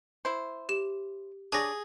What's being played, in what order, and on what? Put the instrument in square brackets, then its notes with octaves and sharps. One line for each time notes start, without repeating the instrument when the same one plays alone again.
[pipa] E4 C5
[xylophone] G4 E7
[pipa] D4 C#5 D5 [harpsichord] G#4 [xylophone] G#5 A#6